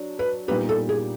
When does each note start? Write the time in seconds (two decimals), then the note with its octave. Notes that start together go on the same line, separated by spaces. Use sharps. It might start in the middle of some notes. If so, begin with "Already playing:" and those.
Already playing: F#3 D4
0.19 B4
0.48 A#2 G3 B3 D#4 G4 B4
0.69 A4
0.89 G#4